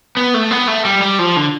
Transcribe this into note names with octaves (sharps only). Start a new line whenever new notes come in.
B3
A3
B3
A3
G3
G3
F3
D3